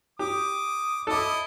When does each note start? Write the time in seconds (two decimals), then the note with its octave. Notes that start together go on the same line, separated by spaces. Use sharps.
0.19 G4 D6 D#6
1.07 E4 A4 D#5 D6